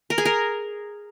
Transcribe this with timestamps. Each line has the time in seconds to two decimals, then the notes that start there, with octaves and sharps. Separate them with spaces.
0.10 A#4
0.18 G#4
0.25 A#4